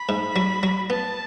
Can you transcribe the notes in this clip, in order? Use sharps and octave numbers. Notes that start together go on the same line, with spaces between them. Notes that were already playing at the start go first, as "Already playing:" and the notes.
Already playing: B5
G#2
F#3
F#3
B3 A5